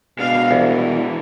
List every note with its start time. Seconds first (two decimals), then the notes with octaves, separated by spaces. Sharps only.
0.19 B2 G#3 D4 F5
0.51 C2 E3